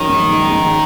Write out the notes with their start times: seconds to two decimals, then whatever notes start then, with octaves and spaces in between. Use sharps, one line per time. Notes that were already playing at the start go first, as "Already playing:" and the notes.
Already playing: A#1 D#3 F#3 C#4
0.09 G#2
0.30 G#2
0.52 G#2